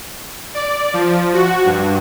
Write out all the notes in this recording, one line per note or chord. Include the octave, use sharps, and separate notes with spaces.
D5
F3
F#4
G2